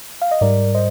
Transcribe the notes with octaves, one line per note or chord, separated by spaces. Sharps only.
F5
D#5
G#2 G3 A#4 D5
C5 D#5